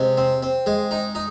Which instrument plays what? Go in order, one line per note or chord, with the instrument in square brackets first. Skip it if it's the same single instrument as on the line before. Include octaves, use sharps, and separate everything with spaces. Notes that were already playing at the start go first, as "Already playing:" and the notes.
Already playing: [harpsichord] C3 G#3
C4
C4
G#3
D#4
D#4